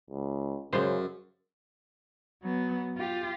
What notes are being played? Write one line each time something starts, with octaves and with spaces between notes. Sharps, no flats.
C#2
F#2 C#3 G#3 F4 C5
F#3 B3
F4 G4